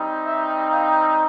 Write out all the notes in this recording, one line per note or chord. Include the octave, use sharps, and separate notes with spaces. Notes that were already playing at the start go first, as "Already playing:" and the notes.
Already playing: G3 C4 D#4
E5
F5